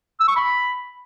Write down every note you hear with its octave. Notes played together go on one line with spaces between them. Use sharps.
E6
C#6
B5